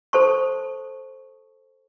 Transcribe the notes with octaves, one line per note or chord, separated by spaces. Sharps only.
A4 C5 A5 C#6